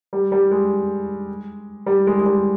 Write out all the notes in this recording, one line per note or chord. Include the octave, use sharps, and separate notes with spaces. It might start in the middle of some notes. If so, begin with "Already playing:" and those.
G3
G3
G#3
G3
G#3
G#3
G3